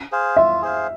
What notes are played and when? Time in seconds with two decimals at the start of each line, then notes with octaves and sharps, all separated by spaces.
0.12 G#4 C5 F5
0.37 F4 E5
0.62 G#4 C5 F5